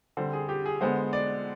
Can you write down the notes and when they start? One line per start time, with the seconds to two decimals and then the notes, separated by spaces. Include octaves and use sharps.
0.17 D3 G3 C4 C5
0.33 G#4
0.49 G4
0.66 G#4
0.81 D3 G#3 B3 C5
1.13 D5